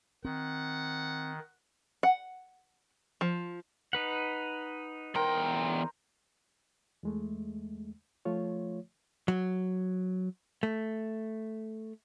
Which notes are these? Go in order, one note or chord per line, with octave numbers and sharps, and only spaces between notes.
D#3 C4 F#5
F#5
F3
D#4 B4 F#5
E2 A#4 C5 G5
E2 G#3 A3
F3 A3 F4 C#5
F#3
A3